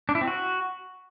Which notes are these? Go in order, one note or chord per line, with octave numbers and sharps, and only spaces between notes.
D4
E4
C4
F#4